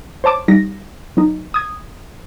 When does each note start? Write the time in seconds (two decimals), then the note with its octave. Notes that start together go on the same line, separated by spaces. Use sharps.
0.24 C5 C#5 A5 D6
0.48 G3 D#4 A#6
1.17 F#3 D#4
1.54 D#6 G#6